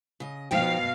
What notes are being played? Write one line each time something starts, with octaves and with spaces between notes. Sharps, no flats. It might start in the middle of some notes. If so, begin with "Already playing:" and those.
C#3 D#5
B2 F3 D#4 F5 G5